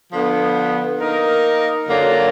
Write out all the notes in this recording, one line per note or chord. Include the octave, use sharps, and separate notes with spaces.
D3 F3 B3
A#3 D#4 A#4
F#2 D3 F#3 A#3 F4